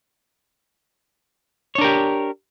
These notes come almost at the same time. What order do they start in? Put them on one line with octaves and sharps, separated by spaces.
C#5 D4 A#4 G4